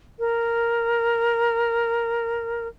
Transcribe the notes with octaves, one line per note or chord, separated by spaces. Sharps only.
A#4